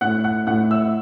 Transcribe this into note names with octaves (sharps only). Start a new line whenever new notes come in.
A2 F#5 F#6
F#5 F#6
A2 F#5 F#6
E5 E6